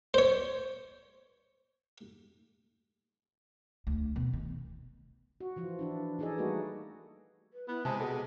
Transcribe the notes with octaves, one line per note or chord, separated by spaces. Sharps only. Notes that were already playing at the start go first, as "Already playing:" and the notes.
C5 C#5
D2
B2
D#3
F#4
E3 F3 F4
E3 D4 E4
E3 D#4 G#4 A4 D5 D#5
G3 A3 A#3 D#4 F#4 B4
B4
B3 E4
C3 G#3 C5 A5
B2 G#4 A4 D#5